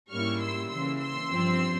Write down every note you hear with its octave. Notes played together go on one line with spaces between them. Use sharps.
G#2 G3 A#3 C#4 E4 C#6 F6
C6 E6
C#3 E3 A#3 C6 E6
C6 E6
G2 F3 C4